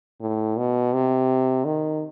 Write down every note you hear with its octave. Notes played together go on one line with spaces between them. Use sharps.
A2
B2
C3
D#3